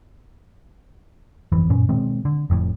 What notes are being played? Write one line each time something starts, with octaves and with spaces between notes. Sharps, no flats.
G1 F2 E3
F#2 A#2 C#4
B2 D#3 G#3 C4
D3
F1 F2 A2